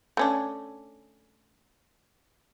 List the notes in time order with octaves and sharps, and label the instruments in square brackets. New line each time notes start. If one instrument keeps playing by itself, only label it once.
[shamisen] A3 C#4 D4